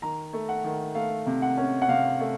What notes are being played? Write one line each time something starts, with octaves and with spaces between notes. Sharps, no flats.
D#3 A#5
A3
F#5
D#3
A3 F5
C3
F#5
C#4
F#5
C3 F5
A3